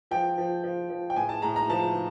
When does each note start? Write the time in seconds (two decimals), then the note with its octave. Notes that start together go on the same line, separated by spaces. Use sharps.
0.11 F3 G5
0.38 F3
0.64 F3
0.90 F3
1.10 G5
1.16 A2 G#5
1.29 A5
1.42 A2 A#5
1.56 A#5
1.70 F3 A5